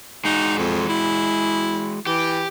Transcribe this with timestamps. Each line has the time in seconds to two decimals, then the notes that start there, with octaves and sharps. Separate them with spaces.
0.25 G#3 D#4 F#4
0.58 F2
0.89 E4
2.07 E3 G4